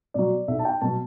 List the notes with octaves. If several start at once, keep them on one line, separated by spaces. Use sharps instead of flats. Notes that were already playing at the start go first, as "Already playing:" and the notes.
B2 F#3 D5
B1 E5
A5
G5
B2 F#3 A5